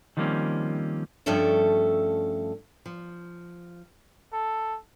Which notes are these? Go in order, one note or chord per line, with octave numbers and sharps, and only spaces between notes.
D#3 F3 G3 A#3 C4 C#4
G2 F3 A3 C#4 A4 E5
F3
A4